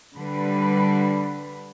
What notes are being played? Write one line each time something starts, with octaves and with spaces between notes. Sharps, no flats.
D3 G3 B4